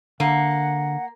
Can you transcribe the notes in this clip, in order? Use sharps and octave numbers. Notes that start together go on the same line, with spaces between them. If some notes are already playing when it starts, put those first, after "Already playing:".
D3 A#3 F#5